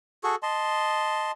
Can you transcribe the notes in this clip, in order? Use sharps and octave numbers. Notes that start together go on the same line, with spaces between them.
F#4 G#4 A4 C#6
D#5 A5 C6